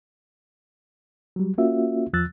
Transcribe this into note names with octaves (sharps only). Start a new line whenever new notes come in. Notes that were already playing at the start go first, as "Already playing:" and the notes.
F#3 G3
A#3 C#4 F4 F#4 E5
E2 F3 E6 F#6 A6